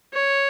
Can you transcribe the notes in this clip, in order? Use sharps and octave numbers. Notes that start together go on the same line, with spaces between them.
C#5